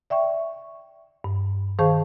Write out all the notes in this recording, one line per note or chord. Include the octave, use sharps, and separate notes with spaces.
D5 E5 G5 C#6
G2
D#3 G#4 C5 F5 A5 C#6